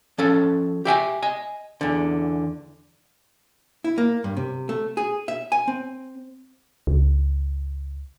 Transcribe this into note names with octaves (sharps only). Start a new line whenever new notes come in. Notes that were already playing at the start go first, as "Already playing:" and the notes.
F3 C#4 A4
G4 E5 G5 G#5
D#5 G#5
E2 D3
E4
A#3
G2
C3
A3
G#4
E5
G#5
C4
C#2